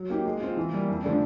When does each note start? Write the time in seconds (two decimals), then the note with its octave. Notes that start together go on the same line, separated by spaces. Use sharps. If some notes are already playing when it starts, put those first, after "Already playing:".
Already playing: F#3
0.10 A#3 D#4 G4
0.25 G#3
0.41 C4 F4
0.57 E3
0.72 G3 A#3
0.88 F2
1.04 D3 F3 A3 D4